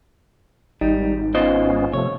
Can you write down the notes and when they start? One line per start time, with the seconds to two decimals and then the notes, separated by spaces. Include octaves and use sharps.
0.81 G#1 G3 D#4
1.35 B3 C#4 F4 C5 D#5
1.93 C3 F3 A3 C#5